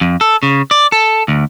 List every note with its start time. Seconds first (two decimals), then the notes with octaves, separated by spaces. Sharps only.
0.01 F2
0.21 A4
0.43 C#3
0.71 D5
0.92 A4
1.28 D2